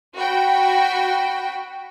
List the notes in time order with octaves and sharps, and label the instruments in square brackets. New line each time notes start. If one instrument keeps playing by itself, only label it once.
[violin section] F#4 G5 B5